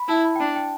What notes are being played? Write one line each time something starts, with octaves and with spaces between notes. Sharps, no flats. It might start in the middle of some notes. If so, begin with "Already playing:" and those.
Already playing: B5
E4 A5
B5
G5
D4 A5
G5